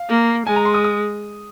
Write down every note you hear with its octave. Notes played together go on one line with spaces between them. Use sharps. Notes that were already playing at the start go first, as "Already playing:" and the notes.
Already playing: F5
A#3
G#3 G#5
A#5
C6
D#6
D#6